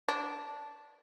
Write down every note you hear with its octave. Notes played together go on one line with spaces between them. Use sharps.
D4